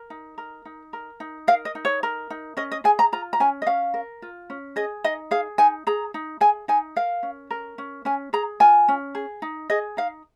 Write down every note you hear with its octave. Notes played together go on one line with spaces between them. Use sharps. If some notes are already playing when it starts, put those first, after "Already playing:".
Already playing: A#4
D#4
A#4
D#4
A#4
D#4
A#4 F5
D#5
D#4
C#5
A#4
D#4
C#4 D#5
D#5
G#4 G#5
A#5
F4 A#5
A#5
C#4 G#5
D#5
C#4 F5
A#4
F4
C#4
G#4 D#5
D#4 D#5
G#4 F5
D#4 G#5
G#4 A#5
D#4
G#4 G#5
D#4 G#5
A#4 F5
C#4
A#4
C#4
C#4 G#5
G#4 A#5
F4 G#5
C#4
G#4
D#4
G#4 D#5
D#4 F5